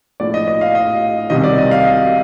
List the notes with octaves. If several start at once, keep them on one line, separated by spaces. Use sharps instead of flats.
A#1 A2 D5
D#5
D#5
F5
D#5
C2 C3 D#3 D#5
D5
D#5
F5
D#5